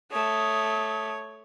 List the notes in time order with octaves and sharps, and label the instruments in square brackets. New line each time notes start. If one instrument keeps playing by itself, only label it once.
[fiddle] A3 [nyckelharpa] C#5 [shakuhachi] D#6